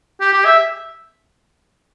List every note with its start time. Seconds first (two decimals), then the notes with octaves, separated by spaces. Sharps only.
0.21 G4
0.33 G4
0.45 E5